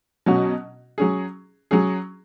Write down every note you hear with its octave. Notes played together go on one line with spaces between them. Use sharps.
B2 F#3 C#4 F#4
F#3 C#4 G#4
F#3 C#4 G#4